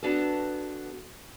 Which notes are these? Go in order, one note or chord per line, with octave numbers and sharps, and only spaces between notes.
B3 D4 F#4 A4